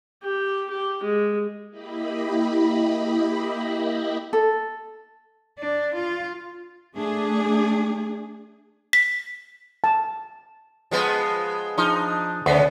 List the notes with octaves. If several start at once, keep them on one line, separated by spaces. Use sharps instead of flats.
G4
G4
G#3
A#3 E4 G4 D#5 B5
A4
D4
F4
A3 D4 G#4
B6
A5
F3 G#3 B3
F3 D4 D#4
D2 C#3 B3